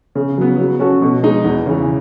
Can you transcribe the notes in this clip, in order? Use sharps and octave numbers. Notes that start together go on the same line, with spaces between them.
C#3
F#3 B3
F#3
C#4 F#4 A4
B2
G#3 D#4
E2
C#3 E3